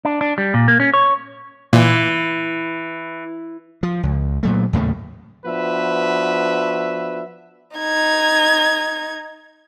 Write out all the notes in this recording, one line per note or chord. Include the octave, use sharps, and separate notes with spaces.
D4
D4
G3
A#2
A#3
C#4
C#5
A#2 E3
F3
C#2
A#2 F#3 A3
D#2 A2 C#3 A3
F3 B3 D4 F#4 B4 E5
D#4 G#6